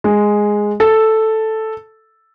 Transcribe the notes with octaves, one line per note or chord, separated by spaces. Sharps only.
G#3
A4